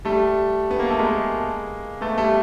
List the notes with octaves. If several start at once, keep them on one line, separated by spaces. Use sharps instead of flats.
G3 A3
B3
A#3
A3
G#3 A#3
A3 B3
G3 A3